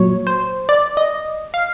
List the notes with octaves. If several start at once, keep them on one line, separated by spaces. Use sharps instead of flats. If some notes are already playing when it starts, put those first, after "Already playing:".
Already playing: A#2 F#3 C#5
C5
D5
D#5
F5